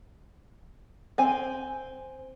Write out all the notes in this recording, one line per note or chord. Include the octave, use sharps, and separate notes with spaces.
C4 G#5